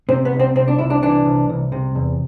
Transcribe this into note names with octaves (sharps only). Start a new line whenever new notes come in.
C3 C4
B3
C2
C4
C3 C4
D4
C2 E4
D4
E3 D4
C2
C2
C3
E2